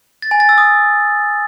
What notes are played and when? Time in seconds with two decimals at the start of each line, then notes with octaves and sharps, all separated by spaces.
0.22 A6
0.31 G#5
0.40 A6
0.49 E6
0.58 D#6